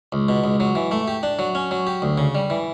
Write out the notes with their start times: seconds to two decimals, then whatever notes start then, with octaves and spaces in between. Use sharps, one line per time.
0.12 C#2
0.29 B2
0.44 C#2
0.60 F#3
0.75 E3
0.91 A3
1.08 G4
1.23 D4
1.39 F#3
1.55 C#4
1.71 F#3
1.87 G4
2.02 D2
2.18 C#3
2.35 G3
2.50 E3